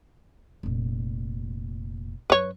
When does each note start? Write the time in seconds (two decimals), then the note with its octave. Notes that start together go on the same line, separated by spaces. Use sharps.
0.63 F1 A#2
2.30 F#2 B4 C#5